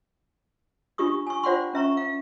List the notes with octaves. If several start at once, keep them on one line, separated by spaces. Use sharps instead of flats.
D4 F4 G4 C#6 D#6
G#5 C#6
F4 C5 D5 F#5 G5 C6
C#4 E5 A#5 C#6
F5